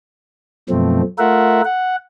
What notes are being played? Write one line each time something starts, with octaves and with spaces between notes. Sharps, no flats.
F#2 B2 F3 A3 C4
A3 F4 A#4 E5 F#5
F#5